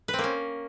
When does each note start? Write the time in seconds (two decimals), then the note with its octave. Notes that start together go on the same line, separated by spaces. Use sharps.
0.08 B4
0.13 C4
0.19 A#3
0.24 C#4